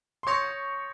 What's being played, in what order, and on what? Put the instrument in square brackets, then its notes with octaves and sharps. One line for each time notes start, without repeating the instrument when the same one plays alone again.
[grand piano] C6
[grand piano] C#5 C#6 [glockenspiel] D#6 G6 A#6 C#7 F7